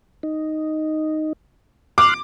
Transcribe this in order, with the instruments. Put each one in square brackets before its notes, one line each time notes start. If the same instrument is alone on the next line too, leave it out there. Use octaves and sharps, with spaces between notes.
[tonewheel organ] D#4
[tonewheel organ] C6 F6 F#6 [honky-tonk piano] D6